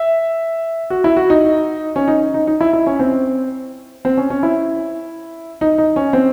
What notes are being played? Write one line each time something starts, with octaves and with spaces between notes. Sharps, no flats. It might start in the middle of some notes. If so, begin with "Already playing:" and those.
Already playing: E5
F#4
E4
F#4
D#4
C#4
D#4
D#4
D#4
E4
E4
C#4
C4
C4
C#4
C#4
E4
D#4
D#4
C#4
C4